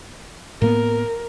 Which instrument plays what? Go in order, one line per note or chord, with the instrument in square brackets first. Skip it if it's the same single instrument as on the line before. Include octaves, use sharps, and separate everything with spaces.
[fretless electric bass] A2 A#3 B3 [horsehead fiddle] A#4